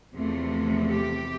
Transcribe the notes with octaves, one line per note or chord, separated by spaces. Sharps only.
E2 C3 F3 A3
G4